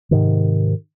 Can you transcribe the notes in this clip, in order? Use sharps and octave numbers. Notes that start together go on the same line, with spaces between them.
G#2 C3 D#3